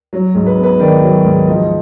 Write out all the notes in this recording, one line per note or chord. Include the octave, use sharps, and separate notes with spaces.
F#3
G#2
B4
B3
B4
D#3 D5
F#3
G#2
F3 D#5